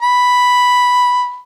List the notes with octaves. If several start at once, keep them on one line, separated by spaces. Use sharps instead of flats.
B5